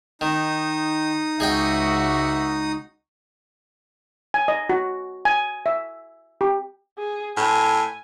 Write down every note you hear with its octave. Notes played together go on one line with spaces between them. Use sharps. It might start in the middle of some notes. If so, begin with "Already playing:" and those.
D#3 D#4 D#6
C#2 F#4 G#4 D#5 E5 G5
G#5
D#5
F#4
G#5
E5
G4
G#4
A2 G#5